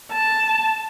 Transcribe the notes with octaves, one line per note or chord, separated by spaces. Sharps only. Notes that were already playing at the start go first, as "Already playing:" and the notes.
A5